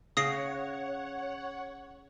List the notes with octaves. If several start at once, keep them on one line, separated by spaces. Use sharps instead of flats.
C#3 C#5 F#5 D#6 A#6 C7